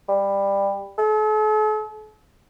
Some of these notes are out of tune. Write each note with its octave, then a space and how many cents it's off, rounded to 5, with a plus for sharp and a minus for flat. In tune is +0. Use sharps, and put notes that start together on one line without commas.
G3 +15
A4 -45